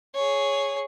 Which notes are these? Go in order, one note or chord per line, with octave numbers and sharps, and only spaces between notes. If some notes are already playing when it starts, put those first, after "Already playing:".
G#4 C#5